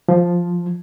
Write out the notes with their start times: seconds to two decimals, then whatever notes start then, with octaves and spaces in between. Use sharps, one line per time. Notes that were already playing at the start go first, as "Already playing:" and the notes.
0.08 F3